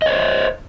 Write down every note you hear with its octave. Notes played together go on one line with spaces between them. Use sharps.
C5 C#5 D#5